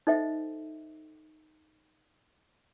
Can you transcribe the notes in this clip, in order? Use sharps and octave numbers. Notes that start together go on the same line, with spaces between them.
D#4 A4 C5 D#5 E5 G5